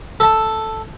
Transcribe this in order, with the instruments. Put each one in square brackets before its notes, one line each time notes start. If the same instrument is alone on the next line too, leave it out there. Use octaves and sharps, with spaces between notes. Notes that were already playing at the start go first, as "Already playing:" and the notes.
[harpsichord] A4 A5